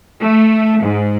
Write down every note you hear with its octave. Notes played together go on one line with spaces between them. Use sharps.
A3
G#2